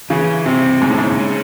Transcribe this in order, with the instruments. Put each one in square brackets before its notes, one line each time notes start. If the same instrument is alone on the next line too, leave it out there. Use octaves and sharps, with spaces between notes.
[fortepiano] C#3 [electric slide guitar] E3
[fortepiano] C3 [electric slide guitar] C4
[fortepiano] G#2 [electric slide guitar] C#3
[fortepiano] A2
G#2
[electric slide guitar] C#4